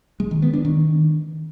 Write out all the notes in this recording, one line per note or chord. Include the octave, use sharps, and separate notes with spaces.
G#3
D#3
B3
D4
D#3